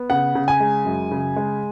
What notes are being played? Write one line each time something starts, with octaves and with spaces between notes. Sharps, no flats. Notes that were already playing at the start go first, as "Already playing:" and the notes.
Already playing: B3
C#3 F#5
C#3
G#5
G#3
F#2
C#3
G#3